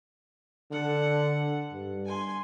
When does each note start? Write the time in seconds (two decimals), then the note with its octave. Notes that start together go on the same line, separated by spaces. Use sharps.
0.71 D3 A4 F#5
1.72 G2
2.06 G#5 C6